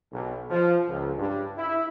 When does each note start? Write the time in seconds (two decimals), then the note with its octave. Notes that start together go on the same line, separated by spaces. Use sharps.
0.13 B1
0.50 F3
0.88 C#2
1.18 G2
1.58 E4